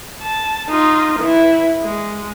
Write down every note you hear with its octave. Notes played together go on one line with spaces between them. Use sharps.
A5
D#4 F4
E3 E4
G#3